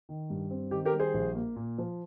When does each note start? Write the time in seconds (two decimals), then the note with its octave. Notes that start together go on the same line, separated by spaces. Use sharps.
0.09 D#3
0.30 G2
0.51 C4
0.71 D#3 G4
0.85 G4 A#4
0.93 G3
1.00 G#4 C5
1.14 A#1
1.35 A#3
1.56 A#2
1.78 F3